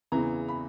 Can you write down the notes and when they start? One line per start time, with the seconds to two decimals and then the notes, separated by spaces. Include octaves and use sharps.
0.12 E2 C#3 E3 A#5
0.48 B5